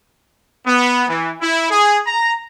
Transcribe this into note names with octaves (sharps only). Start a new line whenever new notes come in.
B3
E3
E4
G#4
A#5